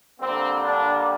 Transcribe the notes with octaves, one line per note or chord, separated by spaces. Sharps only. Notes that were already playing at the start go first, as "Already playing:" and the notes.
D3 G3 A#3 C4
D4